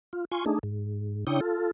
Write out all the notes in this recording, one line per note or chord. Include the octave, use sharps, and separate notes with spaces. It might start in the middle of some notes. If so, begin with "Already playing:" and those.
F4
F4 G#5 C6 C#6
A3 D4 D#4 G#4
G#2
C#3 D4 E4 C#5 G5 D#6
F4 A4